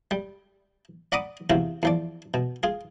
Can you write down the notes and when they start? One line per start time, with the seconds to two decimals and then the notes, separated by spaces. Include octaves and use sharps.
0.11 G3
1.12 D5 F#5 A#5 B5 D6 D#6
1.50 E2 C3 F4 F#4
1.83 E2 F3 D5
2.34 B2
2.63 F4 G#4